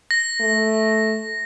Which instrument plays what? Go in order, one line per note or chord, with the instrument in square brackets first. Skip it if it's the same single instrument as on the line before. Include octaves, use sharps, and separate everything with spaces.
[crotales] A#6
[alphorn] A3